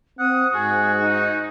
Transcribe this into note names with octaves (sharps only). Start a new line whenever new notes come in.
C4 F#5 D#6
G#2 F#4 G#4
D#4